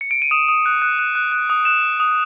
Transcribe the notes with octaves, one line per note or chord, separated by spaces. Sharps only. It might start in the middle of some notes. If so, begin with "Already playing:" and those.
C#7
D7
D#7
D#6 E7
D#6
F#6
F#6
F#6
F#6
F#6
D#6
F#6 E7
D#6
D#6